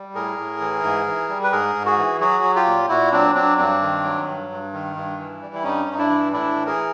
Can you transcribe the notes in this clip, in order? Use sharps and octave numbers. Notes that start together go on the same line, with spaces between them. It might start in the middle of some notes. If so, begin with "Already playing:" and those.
Already playing: G3
A2 G#4 A#4
A2
E3
G#2
E3
G3
B4
G#2 G#4 A#4
G#2
F#4 G#4
E3
F#3 F#4 G#4
F#3
F4 G4
A#2
A#2 E4 F#4
F#3 C4 D4
F#3 C4 D4
G2 C4 D4
D#3
F#3
G2
G2
D#3
G2
E3
G3
E4
G2 C#4 D#4
G2
D#4
D4 E4
E3
A2 D4 E4
E3
G#4 A#4